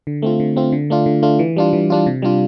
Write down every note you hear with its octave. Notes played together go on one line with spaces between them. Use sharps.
D3
A3 C4 F4
D3
A3 C4 F4
D3
A3 D4 F4
D3
A3 D4 F4
E3
G3 D4 F4
E3
G3 D4 F4
C3
G3 D4 F4